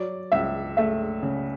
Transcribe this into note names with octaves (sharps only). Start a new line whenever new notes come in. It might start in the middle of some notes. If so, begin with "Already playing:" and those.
Already playing: F#3 D5
C#2 E5
A3 E5
C#3